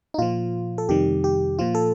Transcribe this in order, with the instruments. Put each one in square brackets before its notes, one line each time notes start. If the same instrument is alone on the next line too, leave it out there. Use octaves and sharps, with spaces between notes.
[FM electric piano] D#4
A#2 F3 F4
A4
F2 C3 D#3 G3 G4
G4
A#2 F3 F4
A4